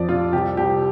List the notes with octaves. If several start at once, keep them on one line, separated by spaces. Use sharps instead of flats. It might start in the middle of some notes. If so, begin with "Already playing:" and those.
Already playing: F2 F3 D5
C3 F4
C2 G4
C2 G4